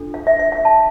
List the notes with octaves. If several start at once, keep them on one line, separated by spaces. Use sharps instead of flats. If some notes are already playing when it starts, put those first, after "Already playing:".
Already playing: D4 F4 A4
F5
E5
E5
F5
A5